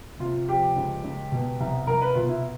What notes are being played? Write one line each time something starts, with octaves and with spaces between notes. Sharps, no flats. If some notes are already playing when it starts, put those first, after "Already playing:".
C3 F4
F3 G4
C#2
C#2
B2
C2
C2 A#4
B4
B2 F4
E4